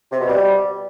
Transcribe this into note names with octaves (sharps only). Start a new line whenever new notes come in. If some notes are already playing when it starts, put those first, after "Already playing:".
C3
B2
G3